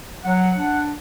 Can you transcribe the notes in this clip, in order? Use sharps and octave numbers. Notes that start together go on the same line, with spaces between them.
F#3 F#5
D4